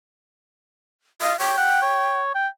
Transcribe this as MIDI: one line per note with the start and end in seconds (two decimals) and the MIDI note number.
1.21 1.32 75
1.21 1.39 77
1.39 1.53 73
1.39 2.21 79
1.57 1.79 78
1.82 2.34 73
2.35 2.47 79